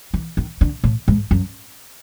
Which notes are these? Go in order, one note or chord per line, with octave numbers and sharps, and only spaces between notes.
E3
D#3
D3
A2
G#2
F#2